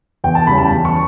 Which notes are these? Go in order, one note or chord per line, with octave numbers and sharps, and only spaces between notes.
E2 G5
A5
C#3 E3 G3 C#4 B5
A5
E2
C#6